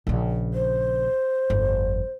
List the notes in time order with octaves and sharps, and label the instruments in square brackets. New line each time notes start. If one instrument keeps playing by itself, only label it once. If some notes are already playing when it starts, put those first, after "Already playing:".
[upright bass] A#1 C#3
[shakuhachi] C5
[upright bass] G1 F2